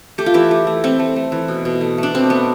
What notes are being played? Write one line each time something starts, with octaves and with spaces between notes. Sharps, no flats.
A3 G4
F4
E3 E4 G4
A3
A3
A3 C4
A3
A3
E3
B2
B2
A3
A3 D4
B2 C4
A3 B3